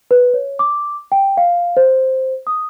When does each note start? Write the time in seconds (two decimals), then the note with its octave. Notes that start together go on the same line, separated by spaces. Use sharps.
0.11 B4
0.34 C#5
0.59 D6
1.12 G5
1.37 F5
1.77 C5
2.47 D#6